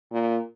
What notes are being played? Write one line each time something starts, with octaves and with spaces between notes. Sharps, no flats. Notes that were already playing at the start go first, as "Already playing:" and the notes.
A#2